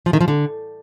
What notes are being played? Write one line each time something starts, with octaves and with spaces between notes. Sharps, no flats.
F3
D#3
F3
D3